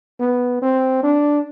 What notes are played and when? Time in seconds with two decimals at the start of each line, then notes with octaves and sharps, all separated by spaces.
0.20 B3
0.62 C4
1.03 D4